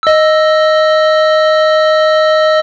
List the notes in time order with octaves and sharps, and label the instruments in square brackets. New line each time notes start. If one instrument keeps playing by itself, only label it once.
[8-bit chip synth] D#5 E6